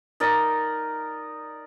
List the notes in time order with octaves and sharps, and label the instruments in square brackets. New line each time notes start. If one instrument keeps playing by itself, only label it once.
[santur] D#4 A#4 D5 D#5